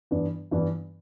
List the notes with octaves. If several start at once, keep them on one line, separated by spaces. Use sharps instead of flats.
G2 E3 B3 D4
G2 E3 B3 D4